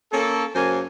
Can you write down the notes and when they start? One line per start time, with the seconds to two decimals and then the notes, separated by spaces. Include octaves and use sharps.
0.12 A#3 C#4 A4
0.55 F#2 C#3 A#3 C5 G#5